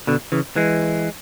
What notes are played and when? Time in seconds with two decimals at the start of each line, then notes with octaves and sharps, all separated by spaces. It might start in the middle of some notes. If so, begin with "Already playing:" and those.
0.07 B2 D3
0.32 C#3 E3
0.56 E3 G#3